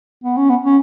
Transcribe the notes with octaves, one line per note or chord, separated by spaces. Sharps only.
B3
C#4
B3
C#4